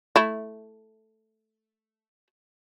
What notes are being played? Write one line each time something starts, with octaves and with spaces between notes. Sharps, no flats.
A3 E4